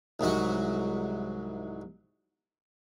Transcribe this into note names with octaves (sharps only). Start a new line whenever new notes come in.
C2 G#2 F#3 F#4